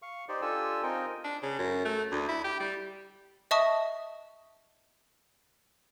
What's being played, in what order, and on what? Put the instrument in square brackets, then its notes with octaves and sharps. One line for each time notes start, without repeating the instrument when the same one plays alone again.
[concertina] F5 C#6
D#4 G4 C5 D5
D4 F4 G4 A4 G#5 E6
C4 D#4 F4 A#4 G5 G#5
[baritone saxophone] D4
C#3
F#2
A3
D2
E4
G4
G3
[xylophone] D#5 E5 A5 C#6 D#6